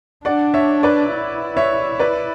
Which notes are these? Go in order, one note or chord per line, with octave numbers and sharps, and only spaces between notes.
D4 D5 F#5
C#5 E5
B4 D5
E4
C#5 E5
B4 D5